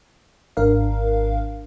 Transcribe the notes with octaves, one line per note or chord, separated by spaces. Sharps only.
G#1 D4 A#4 F5